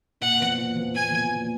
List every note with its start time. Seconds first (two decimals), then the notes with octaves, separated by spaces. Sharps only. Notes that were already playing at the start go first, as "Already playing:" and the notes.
0.21 A#2 F#5
0.40 F3 B3
0.57 A#2
0.76 F3 B3
0.94 A#2 G#5
1.12 F3 B3
1.31 A#2